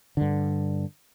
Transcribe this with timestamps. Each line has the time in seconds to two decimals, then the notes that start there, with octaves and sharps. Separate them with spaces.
0.17 G2 D3